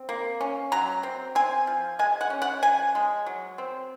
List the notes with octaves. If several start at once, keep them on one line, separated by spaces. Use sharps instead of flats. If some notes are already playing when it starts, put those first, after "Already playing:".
Already playing: C4
A#3
C#4
F#3 A#5
C4
C4 G#5
F3
G#3 G#5
F#5
C#4
F#5
F3 G#5
G#3
F#3
C4